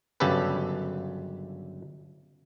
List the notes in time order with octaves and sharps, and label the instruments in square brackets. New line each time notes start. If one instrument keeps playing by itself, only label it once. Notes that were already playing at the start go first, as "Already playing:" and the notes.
[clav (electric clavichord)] G1 F#2 C#3 G4 A4 B4